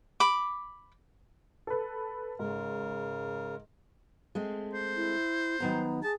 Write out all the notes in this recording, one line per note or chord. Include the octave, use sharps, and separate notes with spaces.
B5 D6
A4 B4
G#2 C#3 A#4
G#3 A3 C4
C5
E4
D#3 F#3 B3 A#5
G#4 A5